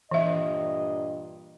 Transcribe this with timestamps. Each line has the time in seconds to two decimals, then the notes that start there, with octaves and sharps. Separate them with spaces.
0.11 G2 A#2 E3 D#5 E5